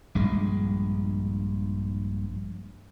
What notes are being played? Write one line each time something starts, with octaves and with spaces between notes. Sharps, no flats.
A#1 G2 G#3